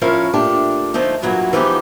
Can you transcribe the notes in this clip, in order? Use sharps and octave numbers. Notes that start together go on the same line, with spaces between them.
F3 C#4 E4 A#4 C#5 F5
A#2 A3 D4 G4
D3 F3 A3 A#3 D#4
G2 A#2 E3 F#3 A#3 F#4
E3 F3 G#3 B3 D#4 G4